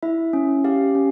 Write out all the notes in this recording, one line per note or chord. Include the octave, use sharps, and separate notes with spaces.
E4 E5
C#4
G4 F5
C#4